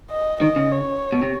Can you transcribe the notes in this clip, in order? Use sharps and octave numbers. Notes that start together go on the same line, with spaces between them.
D#5
D#3 D#5
C#3
C#5
B2
C3